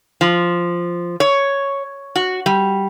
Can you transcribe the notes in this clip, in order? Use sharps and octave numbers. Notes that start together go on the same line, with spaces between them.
F3
C#5
F#4
G3